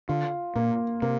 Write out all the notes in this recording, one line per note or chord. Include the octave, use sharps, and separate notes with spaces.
D3 F4
A#2 A#3
C3 A#3